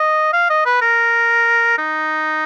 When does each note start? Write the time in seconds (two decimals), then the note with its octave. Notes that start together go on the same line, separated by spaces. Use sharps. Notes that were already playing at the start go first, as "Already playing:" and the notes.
Already playing: D#5
0.33 F5
0.50 D#5
0.66 B4
0.81 A#4
1.78 D#4